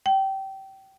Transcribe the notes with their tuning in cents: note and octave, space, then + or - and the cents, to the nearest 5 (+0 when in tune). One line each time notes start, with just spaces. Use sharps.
G5 -20